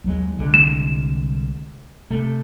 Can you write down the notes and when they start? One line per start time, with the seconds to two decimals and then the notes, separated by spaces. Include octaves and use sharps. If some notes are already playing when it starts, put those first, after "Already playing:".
0.04 D#2 F#3 G#3
0.38 C2 D3 G#3
0.54 E7
2.10 C3 A3